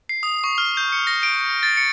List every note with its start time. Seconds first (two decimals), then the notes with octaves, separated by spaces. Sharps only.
0.09 C7
0.23 D#6
0.44 C#6
0.58 F6
0.77 G6
0.92 C#7
1.07 A#6
1.23 D7
1.49 C#7
1.63 A6
1.77 C#7